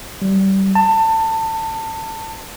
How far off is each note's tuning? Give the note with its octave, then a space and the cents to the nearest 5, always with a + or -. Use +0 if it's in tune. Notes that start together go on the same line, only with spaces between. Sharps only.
G3 -25
A5 +25